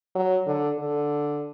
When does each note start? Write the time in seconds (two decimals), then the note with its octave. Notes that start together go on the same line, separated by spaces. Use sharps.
0.15 F#3
0.47 D3
0.79 D3